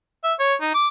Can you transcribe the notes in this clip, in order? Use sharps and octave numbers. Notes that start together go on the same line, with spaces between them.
E5
C#5
D#4
D6